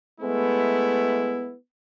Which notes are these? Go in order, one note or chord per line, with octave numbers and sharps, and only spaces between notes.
G#3 A3 B3 E4